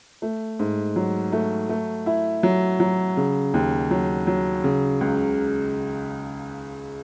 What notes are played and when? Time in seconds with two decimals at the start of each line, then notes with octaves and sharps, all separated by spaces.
0.22 A3
0.59 G#2
0.96 F#3
1.32 A3
1.69 A3
2.06 E4
2.43 F#3
2.80 F#3
3.17 C#3
3.54 D#2
3.91 F#3
4.27 F#3
4.64 C#3
5.01 C#2